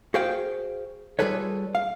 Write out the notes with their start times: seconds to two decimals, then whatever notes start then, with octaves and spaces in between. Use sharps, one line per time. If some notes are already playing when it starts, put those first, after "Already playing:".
0.14 F#4 G#4 C5 F5 G5
1.19 G3 F4 G#4 A4 B4 C#5
1.75 F5